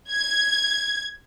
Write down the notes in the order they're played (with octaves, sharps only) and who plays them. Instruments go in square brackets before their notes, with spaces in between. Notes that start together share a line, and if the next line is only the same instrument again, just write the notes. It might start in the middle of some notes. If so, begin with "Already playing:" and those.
[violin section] G#6